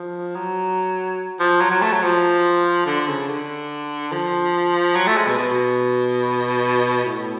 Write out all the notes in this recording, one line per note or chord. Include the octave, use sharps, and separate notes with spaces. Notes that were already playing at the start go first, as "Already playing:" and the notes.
Already playing: F3
F#3
F3
F#3
F#3
A3
F#3
F3
D3
C#3
D3
F3
F#3
A3
G#3
B2
B2
A2